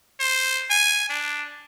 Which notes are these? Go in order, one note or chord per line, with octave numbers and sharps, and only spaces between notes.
C5
G#5
D4